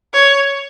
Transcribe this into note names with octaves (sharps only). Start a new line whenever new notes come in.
C#5